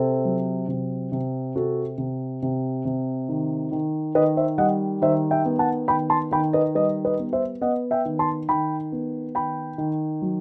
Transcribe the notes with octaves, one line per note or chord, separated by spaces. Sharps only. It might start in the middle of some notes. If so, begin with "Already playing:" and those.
Already playing: C3 A4 C5
F#3
C3
C3
C3 F#4 A4
C3
C3
C3
D#3
D#3
D#3 B4 D#5
C5 E5
G3 D#5 F#5
D#3 C5 E5
E5 G5
B3
F#5 A5
D#3 G5 B5
A5 C6
D#3 G5 B5
B4 D#5
G3 B4 D#5
B4 D#5
B3
C5 E5
B3 D#5 F#5
E5 G5
D#3
A5 C6
D#3 G5 B5
B3
D#3 G5 B5
D#3
F#3